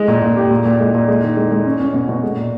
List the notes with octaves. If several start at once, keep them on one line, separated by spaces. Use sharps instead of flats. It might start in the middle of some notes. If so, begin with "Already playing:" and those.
Already playing: G#3
A#2
A#2
G4
A#2
A#2
G#3
A#2
G#3
D#3
G#3
G#3
C#4
C#4
B2
B2
G#3
A#2